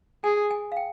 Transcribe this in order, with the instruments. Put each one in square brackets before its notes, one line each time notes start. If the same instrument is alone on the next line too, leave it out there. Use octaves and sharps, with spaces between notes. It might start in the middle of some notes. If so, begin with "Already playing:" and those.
[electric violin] G#4 [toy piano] G#5
[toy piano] G#5
F5
G5